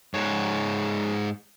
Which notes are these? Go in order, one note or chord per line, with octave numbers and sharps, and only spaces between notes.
G#2 C#5